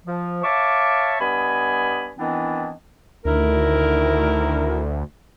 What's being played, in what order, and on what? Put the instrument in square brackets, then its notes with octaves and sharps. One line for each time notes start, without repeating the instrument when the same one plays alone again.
[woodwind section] F3
C#5 E5 F5 A5 C#6 D6
G2 B3 D#5 G#5 B5
D#3 E3 B3 C4 D4 E4
[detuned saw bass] D2 [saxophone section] D#3 E4 A#4